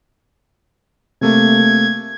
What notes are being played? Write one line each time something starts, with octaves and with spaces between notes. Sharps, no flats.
C3 A3 A#3 G#6